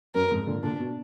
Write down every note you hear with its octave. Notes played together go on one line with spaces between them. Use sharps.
F#2 A#4
F2 G#2
A#2 D3
A#2 D3 D4
B2